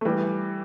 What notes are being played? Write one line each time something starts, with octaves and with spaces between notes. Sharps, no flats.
A3
E3 G3